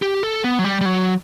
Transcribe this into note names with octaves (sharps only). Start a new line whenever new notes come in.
G4
A4
B3
F#3
G3
G3
F#3